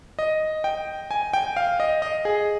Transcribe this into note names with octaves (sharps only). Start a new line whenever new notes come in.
D#5
G5
G#5
G5
F5
D#5
D#5
G#4